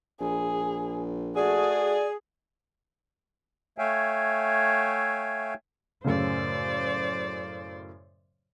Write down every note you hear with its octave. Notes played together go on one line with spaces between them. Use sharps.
A#1 G#4
A3 F#4 G#4 D5
A3 C#5 E5 F5 G5 G#5
F#2 A2 C#3 C5 D5